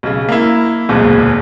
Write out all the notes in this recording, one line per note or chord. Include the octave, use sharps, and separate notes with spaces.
B1 C#3
A#3 E4
D1 B1 E2 A#2 G#3